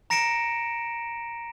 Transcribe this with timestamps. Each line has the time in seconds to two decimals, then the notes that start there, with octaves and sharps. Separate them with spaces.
0.10 A#5 A#6 C#7 D7 E7